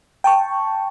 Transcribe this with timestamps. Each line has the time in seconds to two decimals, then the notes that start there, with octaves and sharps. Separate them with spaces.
0.24 G5 A5 C#6